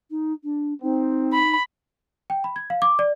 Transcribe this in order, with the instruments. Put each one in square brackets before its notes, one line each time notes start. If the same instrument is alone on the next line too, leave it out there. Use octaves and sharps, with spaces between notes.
[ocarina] D#4
D4
[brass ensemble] C4 [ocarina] D#4
[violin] B5
[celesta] G5
B5
G#6
F5
D6
D5